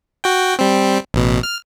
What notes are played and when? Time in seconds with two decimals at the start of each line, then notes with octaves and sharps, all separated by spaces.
0.24 F#4 G5
0.59 G3 C4
1.14 A1 B2
1.43 F6